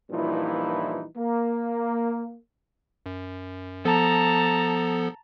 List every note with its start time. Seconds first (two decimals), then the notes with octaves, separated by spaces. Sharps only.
0.10 G2 A#2 E3 F3 D#4 E4
1.17 A#3
3.06 F#2
3.85 F3 B3 A4 A5 A#5